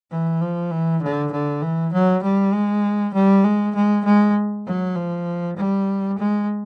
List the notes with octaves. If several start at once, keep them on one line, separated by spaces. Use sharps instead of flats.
E3
F3
E3
D3
D3
E3
F#3
G3
G#3
G3
G#3
G#3
G#3
F#3
F3
G3
G#3